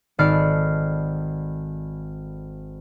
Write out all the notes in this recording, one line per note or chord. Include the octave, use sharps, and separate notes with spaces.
G#1 A4 D5 F6 C7 C#7